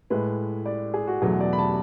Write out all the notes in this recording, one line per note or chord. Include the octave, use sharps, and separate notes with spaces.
A2 G#3 B4
D5
G#4
F#4
E2 B2 F#3 A3 G#4
D5
B5
A5